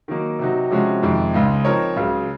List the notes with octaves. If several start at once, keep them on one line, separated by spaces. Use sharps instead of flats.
D#3 F#3 A#3 D#4
C3 F#3 C4 D#4 F#4
C3 F3 G#3 C#4 F#4
F2 C3 D#3 G#3
C#2 C#3 G#3 D#4
F3 C4 D#4 A#4 C#5
C#2 C#3 F#3